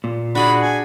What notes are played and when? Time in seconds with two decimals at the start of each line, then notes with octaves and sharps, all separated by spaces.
0.04 A#2
0.35 D4 F#4 G#4 D5 B5
0.62 G#5